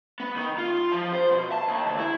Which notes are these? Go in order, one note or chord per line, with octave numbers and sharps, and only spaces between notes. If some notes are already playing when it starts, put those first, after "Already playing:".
B3
D#3
F4
F3
C5
B2
A5
D#2
D2
E4